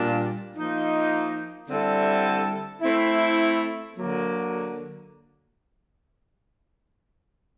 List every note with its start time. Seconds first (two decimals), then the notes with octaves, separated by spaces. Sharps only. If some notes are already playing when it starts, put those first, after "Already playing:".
Already playing: A#2 G3 A#3 D4 F4
0.56 F3 A#3 D#4
1.69 D3 G3 C4 E4 A4
2.81 A3 C4 E4
3.94 D3 F#3 A#3